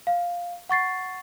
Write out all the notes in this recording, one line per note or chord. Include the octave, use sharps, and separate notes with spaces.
F5
F#5 C#6 A6 C7